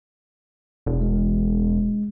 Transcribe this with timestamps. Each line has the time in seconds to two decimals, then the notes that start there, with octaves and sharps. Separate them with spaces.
0.86 E1
1.01 G#3